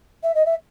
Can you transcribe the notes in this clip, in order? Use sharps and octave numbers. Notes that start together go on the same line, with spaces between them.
E5
D#5
E5